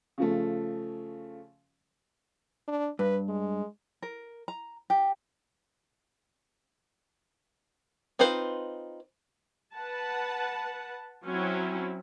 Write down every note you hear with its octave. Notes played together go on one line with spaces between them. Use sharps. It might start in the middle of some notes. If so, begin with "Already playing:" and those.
C#3 F3 A3
D4
G2 B4
G#3
A#4
A#5
G4
C4 D#4 F4 B4 C5
B4 F#5 A5
F#3 C4 C#4 E4